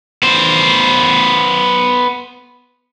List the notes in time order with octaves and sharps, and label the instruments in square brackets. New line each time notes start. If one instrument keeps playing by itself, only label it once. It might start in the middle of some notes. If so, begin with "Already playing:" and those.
[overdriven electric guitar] B3 C5